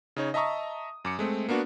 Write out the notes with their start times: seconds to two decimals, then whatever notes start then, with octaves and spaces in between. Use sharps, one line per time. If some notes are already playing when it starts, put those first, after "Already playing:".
0.16 C#3 D#4 C#5
0.34 D#5 E5 A5 A#5 C#6 D#6
1.05 F#2 D6 C#7
1.19 G#3 A3 C4
1.49 A#3 B3 D4 F#4